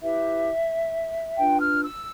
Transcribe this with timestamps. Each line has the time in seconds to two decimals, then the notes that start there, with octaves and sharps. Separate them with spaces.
0.02 E4 G4 B4 E5
1.37 D4 F4 B4 G5
1.61 F6
1.83 E6